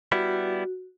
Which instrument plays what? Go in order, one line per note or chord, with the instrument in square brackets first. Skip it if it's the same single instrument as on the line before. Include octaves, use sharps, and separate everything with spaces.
[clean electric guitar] G3 B3 E4 [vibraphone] F#4